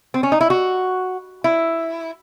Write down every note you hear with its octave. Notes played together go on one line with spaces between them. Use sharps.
C4
C#4
D#4
E4
F#4
E4